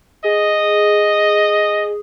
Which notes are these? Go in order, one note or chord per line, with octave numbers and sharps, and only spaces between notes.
G#4 D#5